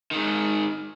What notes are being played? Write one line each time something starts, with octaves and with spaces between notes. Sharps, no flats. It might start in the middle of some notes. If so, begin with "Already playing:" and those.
G#2 D#3